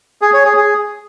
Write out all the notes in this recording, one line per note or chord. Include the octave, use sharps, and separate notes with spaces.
G#4
C#5
G#4
G#4